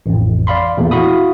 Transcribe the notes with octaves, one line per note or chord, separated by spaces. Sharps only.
A1 F2
D5 F5 B5 C6
E2 A#2 A3
E4 F#4 F5 B5 D#6